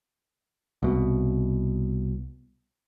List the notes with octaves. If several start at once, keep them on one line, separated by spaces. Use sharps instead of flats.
C2 B2